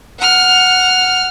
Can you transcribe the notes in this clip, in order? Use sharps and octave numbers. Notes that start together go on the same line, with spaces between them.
F#5 F6